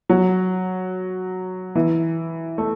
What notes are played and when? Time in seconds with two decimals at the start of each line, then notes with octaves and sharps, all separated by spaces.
0.09 F#3
1.75 E3
2.58 A3